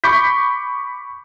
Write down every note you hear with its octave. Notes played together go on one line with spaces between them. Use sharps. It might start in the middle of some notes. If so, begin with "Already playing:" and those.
B5 C#6 D6 G6 B6